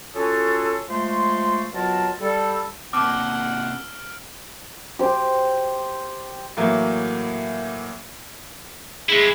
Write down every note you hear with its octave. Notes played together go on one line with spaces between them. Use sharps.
C#4 F4 F#4 G#4 A4
F3 G#3 A3 C#5 C6
B2 F#3 F4 A#4 F5 A5
G3 A4
C3 A#3 F#5 A5 D6 E6 F6 D7
G4 C5
A2 E3 F#3 A#3
G#3 E4 G#4